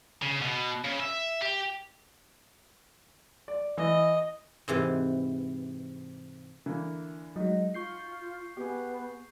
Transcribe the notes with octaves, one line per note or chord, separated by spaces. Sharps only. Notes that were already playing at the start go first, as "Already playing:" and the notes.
C#3
B2
C#3
E5
G4
D5
E3 D#5
G#2 C3 E3
D3 E3 A#3
F#3 G#3 D#4 F#4 D#5
F4 C#6 G6 C7
B3 G4 G#4